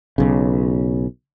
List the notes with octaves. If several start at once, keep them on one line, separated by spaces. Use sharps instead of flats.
B1 C#3